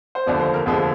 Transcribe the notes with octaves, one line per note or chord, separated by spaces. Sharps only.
C5
F1 D#2 D3 F3 D5
C5
A#4
F1 D#2 D3 F3 G#4